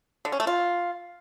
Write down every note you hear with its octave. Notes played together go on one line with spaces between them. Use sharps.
D3
C#4
A3
F4